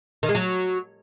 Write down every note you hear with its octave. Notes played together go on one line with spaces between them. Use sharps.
D#3
G#3
F#3